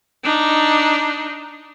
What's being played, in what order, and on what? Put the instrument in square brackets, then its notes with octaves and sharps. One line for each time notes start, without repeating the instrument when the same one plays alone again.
[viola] D4 D#4